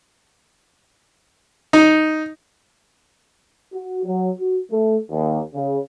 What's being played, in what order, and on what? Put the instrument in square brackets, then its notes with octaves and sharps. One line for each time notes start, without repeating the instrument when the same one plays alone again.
[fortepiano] D#4
[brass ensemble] F#4
F#3
F#4
A3
D#2
C#3